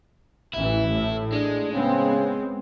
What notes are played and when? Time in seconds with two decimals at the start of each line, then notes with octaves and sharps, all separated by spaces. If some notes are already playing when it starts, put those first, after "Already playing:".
0.54 A1 E3 E4
0.89 A2
1.32 G#3 D4
1.73 C#3 B3 C4